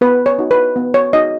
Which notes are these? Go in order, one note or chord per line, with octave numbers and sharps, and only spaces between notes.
B3 B4
C#5
D#4 F#4
B4
B3
C#5
D#4 F#4 D#5